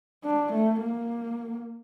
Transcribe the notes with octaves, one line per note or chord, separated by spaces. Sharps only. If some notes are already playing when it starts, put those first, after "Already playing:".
D4
A3
A#3